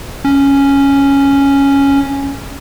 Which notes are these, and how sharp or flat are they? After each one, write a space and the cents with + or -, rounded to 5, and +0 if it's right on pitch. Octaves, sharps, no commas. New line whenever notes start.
C#4 +0